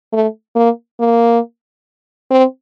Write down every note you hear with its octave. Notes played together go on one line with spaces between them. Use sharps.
A3
A#3
A#3
C4